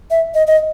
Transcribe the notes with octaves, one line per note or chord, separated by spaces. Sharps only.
E5
D#5
D#5